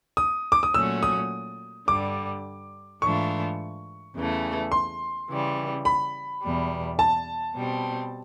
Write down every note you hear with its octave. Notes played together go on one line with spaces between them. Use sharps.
D#6
D6
D#6
A#2 F#3 A3 C#4 F#4 E6
D#6
G2 D3 G3 D6
G#2 E3 A3 D4 F4 C#6
E2 C#3 E3 A3
C6
C#3 E3 G3
B5
E2 B2 G3
A5
B2 G3 C4